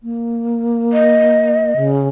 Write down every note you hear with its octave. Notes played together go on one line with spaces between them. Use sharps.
A#3
D#5
C#3